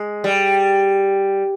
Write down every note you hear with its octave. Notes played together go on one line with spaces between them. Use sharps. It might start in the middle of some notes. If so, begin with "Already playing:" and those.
Already playing: G#3
G3